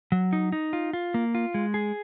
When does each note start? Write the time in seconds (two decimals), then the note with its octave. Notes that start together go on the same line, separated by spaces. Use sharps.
0.12 F#3
0.33 D#4
0.52 D#4
0.73 F4
0.93 F4
1.14 A#3
1.35 F4
1.54 G#3
1.74 G#4